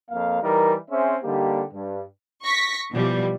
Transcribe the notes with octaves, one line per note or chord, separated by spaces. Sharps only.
F2 A#3 F5
E3 G3 D#4 A#4
C4 C#4 G#4 C5 E5
D3 G3 A#3 D#4 G4
G2
C#6 A#6 B6
B2 E3 F3 G3